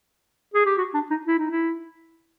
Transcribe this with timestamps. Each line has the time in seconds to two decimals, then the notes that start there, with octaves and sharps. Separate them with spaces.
0.54 G#4
0.66 G4
0.78 F#4
0.94 D4
1.11 D#4
1.27 E4
1.39 D#4
1.51 E4